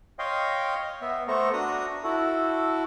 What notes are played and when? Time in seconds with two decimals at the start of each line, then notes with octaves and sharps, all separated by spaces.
0.19 C#5 D#5 F5 G5 C6
1.02 B3 E5
1.28 A3 B3 A4 C5 A#5 C#6
1.53 D4 F#4 A#5 D#6
2.04 E4 F#4 A4